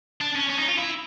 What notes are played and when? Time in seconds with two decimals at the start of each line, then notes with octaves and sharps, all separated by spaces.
0.21 D4
0.36 C#4
0.50 C#4
0.59 D#4
0.68 F4
0.78 E4